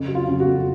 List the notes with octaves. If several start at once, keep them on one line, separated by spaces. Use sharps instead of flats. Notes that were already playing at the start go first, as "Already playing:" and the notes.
Already playing: F2 C#3
F#3
F4
C#3
F#4
F2